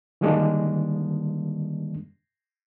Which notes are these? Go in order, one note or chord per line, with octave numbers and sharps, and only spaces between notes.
D3 D#3 G3 G#3 A#3 D4